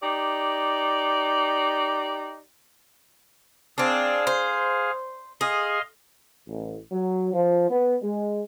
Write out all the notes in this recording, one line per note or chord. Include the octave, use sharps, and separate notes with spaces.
D#4 G4 D5
C4 D4 G#4 F5
C5
G#4 D#5 F5 C6
A1
F#3
F3
B3
G#3